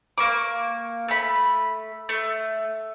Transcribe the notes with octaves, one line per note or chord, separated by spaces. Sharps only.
A#3 C#6 D6
A3 B5
A3